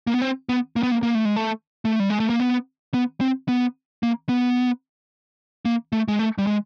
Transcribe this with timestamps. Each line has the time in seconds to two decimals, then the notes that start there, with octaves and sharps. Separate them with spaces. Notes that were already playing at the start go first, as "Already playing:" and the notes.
0.07 A#3
0.14 B3
0.22 C4
0.49 B3
0.76 A#3
0.83 B3
0.92 A#3
1.03 A#3
1.15 A3
1.25 G#3
1.36 A3
1.85 A3
2.00 G3
2.10 G#3
2.20 A3
2.30 A#3
2.40 B3
2.94 B3
3.21 C4
3.48 B3
4.03 A#3
4.29 B3
5.65 A#3
5.93 A3
6.08 G#3
6.19 A3
6.38 G3
6.47 G#3